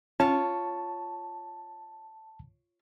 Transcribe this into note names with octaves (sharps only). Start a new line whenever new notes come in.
C#4 F4 C#5 A5